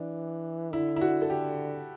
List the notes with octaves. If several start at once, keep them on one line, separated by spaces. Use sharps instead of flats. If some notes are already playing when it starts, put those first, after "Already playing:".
Already playing: E3 D4
D3 E4
E4
F#4
A4
G4